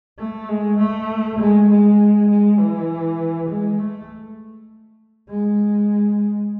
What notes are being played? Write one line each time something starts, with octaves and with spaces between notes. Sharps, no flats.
A3
G#3
A3
G#3
G#3
G#3
E3
G#3
A3
G#3